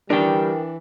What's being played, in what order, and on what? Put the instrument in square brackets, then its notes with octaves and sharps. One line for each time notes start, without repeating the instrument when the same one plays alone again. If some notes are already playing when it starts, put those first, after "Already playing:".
[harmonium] E3 [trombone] G3 [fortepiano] D4 [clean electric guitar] A#4 G5